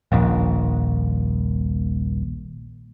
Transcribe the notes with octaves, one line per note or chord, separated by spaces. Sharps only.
D#1 A#1